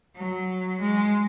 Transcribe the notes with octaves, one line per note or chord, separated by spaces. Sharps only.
F#3
G#3